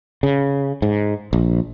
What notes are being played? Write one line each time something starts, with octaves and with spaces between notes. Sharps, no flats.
C#3
G#2
A#1